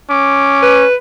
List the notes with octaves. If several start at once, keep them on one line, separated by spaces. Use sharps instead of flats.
C#4 D6
B4